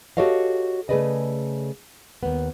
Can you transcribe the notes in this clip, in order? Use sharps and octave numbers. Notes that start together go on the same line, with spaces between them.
F#4 G4 A4 C#5 D#5 F5
C#3 A3 G#4 B4 D5 D#5
D#2 B3